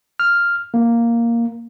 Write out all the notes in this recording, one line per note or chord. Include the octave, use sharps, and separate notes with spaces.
F6
A#3